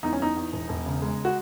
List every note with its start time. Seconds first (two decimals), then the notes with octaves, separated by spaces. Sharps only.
0.03 E2 D#4
0.13 C#4
0.20 E2 D#4
0.37 E2
0.53 E1
0.69 E1
0.86 C#3
1.02 G#3
1.25 F#4